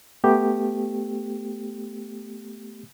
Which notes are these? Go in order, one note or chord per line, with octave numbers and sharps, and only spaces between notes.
A3 B3 G4